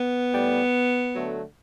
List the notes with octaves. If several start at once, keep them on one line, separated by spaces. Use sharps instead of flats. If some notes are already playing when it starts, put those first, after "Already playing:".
Already playing: B3
A2 G3
D3 F#3 A3